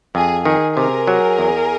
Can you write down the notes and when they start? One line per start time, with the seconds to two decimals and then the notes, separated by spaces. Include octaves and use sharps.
0.15 F2 G#4
0.45 D#3 G#4
0.76 C3 G#4 A#4
1.07 F#3
1.39 E2